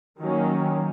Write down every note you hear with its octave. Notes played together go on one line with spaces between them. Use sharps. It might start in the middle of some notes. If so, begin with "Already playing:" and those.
D#3 F#3 A#3 C#4